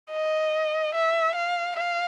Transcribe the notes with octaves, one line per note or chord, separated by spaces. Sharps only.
D#5
E5
F5
F5